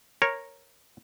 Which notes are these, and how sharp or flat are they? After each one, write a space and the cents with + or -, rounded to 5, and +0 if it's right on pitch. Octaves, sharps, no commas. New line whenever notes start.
A#4 +0 C#5 -15